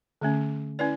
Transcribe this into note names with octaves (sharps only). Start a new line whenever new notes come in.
D3 A3 C#4
C#4 E4 B4 D5